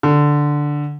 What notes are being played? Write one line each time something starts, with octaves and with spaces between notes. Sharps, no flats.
D3